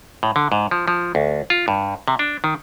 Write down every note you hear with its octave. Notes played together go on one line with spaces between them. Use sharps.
A2
D3
G#2
F3
F3
D2
F4
G2
C3
D4
D#3